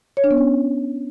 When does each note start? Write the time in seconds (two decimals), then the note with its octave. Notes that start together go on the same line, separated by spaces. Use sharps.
0.17 C#5
0.24 D4
0.31 B3
0.38 C#4